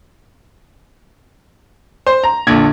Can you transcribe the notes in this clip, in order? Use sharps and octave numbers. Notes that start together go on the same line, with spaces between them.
C5
A#5
A#1 A#2 D3 G#6